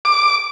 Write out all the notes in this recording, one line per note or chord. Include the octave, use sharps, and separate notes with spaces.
D6